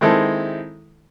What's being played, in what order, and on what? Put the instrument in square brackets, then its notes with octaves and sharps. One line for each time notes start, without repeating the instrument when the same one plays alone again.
[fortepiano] D#3 G#3 C4 E4 A4